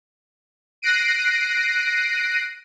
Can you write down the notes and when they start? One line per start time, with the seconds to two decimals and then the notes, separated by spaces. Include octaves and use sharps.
0.82 F#6 A#6 C7 D7 D#7